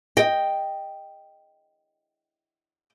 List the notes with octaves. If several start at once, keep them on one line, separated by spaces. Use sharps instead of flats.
D#5 G5